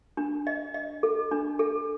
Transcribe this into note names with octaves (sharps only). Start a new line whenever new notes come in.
D4
D#5
D#5
A4
D4
A4